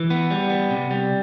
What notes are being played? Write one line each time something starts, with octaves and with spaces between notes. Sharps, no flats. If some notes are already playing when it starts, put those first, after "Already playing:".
Already playing: E3
B3
G3
B3
C3
G3